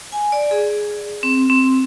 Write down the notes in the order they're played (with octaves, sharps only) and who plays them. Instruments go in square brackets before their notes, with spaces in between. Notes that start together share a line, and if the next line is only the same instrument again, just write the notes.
[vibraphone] G#5
D5
G#4
C4
C4